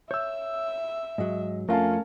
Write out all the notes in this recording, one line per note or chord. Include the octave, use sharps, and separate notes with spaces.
C#5 E5 E6 G6
G#2 F#3 D#5
F2 A3 C#4 F4 A#4 F5 A5